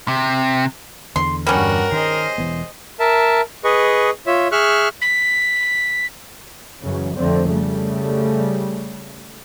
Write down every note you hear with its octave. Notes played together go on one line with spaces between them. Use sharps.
C3
E2 D3 C6
G2 G3 C#4 F#4 A#4 F#5
D#3 G#4 C5 D#5
E1 E3 B3
A#4 E5 A5
G#4 B4 D#5 C#6
F4 C#5 E5
G#4 E5 C#6 F6 F#6
B6
F#2 C#3 E3 F#3
F2 D3 A3 C4
C#3 G3 A3